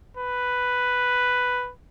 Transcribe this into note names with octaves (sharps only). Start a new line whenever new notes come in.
B4